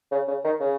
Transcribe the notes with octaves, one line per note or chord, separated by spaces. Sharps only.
C#3
C#3
D#3
C#3